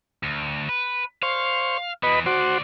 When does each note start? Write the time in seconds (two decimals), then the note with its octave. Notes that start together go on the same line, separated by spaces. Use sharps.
0.23 D2
0.69 B4
1.23 C5 F5 C#6
2.03 E3 B3 B4 D#5 B5
2.26 D2 F#4 C5 D5